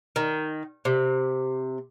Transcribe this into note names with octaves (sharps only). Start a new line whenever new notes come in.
D#3
C3